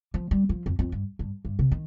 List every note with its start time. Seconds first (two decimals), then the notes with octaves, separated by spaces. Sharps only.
0.14 F3
0.31 G3
0.49 F3
0.66 F2
0.79 F2
0.92 G2
1.19 G2
1.45 G2
1.59 C3
1.72 D#3